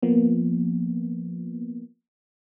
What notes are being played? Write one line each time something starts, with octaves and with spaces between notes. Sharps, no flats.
F3 A#3 B3